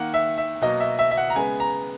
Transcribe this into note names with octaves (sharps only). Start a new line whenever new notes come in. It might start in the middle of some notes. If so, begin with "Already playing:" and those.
Already playing: D#3 A#3 F#5
E5
E5
B2 F#3 A#3 D#5
E5
E5
E5
F#5
A#5
C#3 G#3 B3 G#5
A#5